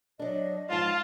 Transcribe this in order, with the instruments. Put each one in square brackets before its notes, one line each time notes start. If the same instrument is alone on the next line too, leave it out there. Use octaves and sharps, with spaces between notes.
[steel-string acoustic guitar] F#3 D4 [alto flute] D#5
[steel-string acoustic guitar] G#2 F3 [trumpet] F4 [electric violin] F5 A5